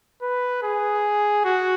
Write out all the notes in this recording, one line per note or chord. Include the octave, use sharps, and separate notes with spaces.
B4
G#4
F#4